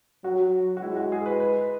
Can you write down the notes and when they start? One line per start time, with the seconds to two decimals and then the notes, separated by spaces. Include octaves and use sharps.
0.24 F#3 F#4
0.77 F#4
0.82 G#3 E4
0.96 F#4
1.12 G#4
1.26 B4
1.40 B4